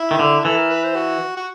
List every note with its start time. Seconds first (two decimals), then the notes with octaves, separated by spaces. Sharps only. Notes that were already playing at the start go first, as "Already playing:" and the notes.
Already playing: E4
0.11 D#3
0.19 D3
0.44 E3 A4
0.58 A#4
0.70 B4
0.84 C5
0.96 F#4
1.37 F#4